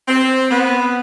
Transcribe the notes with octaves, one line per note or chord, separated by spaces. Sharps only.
C4
B3